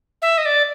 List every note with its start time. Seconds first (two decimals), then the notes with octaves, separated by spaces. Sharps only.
0.22 E5
0.38 D#5
0.45 D5